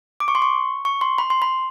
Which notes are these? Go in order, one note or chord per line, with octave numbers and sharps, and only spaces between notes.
D6
C#6
C6
C#6
C#6
C6
B5
C6
B5